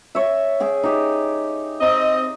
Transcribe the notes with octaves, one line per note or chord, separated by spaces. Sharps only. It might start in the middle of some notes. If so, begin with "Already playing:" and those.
C#5 E5
G#4 G5
D#4 G4
C4 D#5